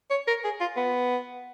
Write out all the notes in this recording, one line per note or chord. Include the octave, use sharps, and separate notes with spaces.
C#5
A#4
G#4
F4
B3